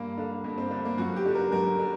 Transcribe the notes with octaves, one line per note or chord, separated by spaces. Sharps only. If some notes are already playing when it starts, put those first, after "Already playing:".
Already playing: G2 A#3
D3
G2 A#3
C4
D3 A3
A#3
F#2 F#4
G4
D3
A#4
F#2 A#4
D3